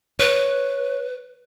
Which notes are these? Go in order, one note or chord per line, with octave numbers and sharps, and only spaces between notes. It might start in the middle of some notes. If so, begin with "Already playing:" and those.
B4 C#5